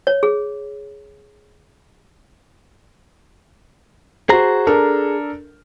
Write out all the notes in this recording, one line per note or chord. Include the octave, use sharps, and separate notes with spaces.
C#5
G#4
F#4 G#4 C5 A#5
D4 A4 A#4